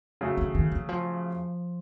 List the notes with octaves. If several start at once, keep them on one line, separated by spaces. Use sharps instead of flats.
C#3 F#3 A3
D#3
D#3
E3
F3